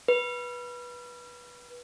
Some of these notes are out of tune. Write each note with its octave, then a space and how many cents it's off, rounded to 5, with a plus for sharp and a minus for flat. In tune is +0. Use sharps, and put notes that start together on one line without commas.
B4 -15